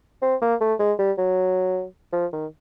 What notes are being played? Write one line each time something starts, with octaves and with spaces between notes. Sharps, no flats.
C4
A#3
A3
G#3
G3
F#3
F3
D#3